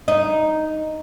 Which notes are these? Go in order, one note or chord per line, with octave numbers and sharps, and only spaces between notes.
D#4